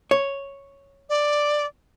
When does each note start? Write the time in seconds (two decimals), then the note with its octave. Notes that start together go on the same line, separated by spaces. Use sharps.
0.11 C#5
1.09 D5